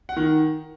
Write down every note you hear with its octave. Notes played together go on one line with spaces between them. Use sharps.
F#5
D#3